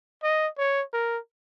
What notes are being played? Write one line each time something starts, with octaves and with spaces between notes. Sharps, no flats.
D#5
C#5
A#4